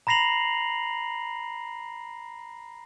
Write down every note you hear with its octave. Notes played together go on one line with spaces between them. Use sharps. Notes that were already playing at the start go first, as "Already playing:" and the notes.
A#5 B5 A#6 C7 F7 F#7